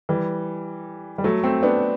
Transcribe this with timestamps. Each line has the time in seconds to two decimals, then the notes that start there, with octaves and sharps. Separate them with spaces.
0.09 E3 G3
1.18 G3
1.24 F#3 A3
1.43 A3 C4
1.63 B3 D4